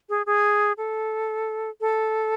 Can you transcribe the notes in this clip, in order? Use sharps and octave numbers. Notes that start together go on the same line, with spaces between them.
G#4
G#4
A4
A4